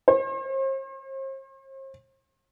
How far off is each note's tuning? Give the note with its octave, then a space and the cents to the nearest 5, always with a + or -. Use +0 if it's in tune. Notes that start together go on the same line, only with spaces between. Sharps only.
C5 +40